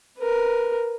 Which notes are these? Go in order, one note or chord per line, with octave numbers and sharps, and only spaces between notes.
A#4 B4